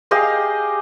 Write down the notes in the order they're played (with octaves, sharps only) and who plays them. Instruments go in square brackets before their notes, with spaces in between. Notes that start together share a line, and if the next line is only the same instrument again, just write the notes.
[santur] G4 G#4 D#5 F5